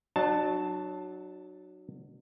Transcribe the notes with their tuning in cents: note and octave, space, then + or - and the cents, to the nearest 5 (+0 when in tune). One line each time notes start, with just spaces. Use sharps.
F#3 +0 D4 +45 A5 +0